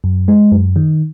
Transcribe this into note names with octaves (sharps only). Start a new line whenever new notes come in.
F#2
G#3
F#2
D#3